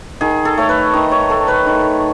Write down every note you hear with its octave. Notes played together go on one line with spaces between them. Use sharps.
D#3 G#4
A4
A3 C#5
B4
D#3 D#5
C#5
A3 A4
B4
D#3